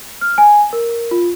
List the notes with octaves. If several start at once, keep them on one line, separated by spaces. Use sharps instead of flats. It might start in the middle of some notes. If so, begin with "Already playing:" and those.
F6
G#5
A#4
F4